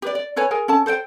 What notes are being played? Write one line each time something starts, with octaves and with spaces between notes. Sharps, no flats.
G4 B4 D5
D5
A4 B4 C#5 G#5
G#4 A#4 G#5
C#4 A4 A5
A4 C5 C#5 G5